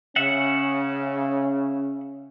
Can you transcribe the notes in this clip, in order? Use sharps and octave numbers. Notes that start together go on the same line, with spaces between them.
C#3 C#4 E5 F#5